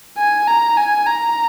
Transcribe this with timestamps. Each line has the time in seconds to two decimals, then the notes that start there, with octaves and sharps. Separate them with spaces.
0.18 G#5
0.47 A#5
0.77 G#5
1.06 A#5